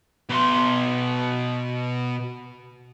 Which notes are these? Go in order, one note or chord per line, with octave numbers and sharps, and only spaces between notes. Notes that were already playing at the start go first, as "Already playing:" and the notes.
B2 C6